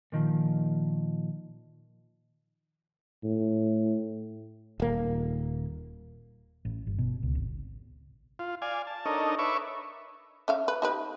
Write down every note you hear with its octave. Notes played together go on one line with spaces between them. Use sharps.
A#2 D#3 F3
A2
D#1 A#3
A1
G1
B2
C#2
G#1
F4
D5 F5 G#5
A5
D4 D#4 A4 A#4 C#5 D#5
B4 C#5 E5 C#6 D6
C#4 E5 F5
B4
D#4 G4 B4